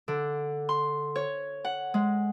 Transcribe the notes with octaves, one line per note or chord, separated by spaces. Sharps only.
D3
C6
C#5
F#5
G#3